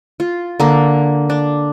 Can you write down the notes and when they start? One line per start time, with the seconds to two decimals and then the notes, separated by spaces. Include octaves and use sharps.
0.20 F4
0.60 D3 A#3
1.30 D4